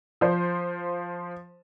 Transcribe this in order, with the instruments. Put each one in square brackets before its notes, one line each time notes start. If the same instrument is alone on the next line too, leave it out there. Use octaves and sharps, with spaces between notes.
[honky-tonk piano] F3 C5